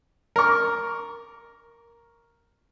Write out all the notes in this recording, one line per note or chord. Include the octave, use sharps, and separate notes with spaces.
A#4 C#6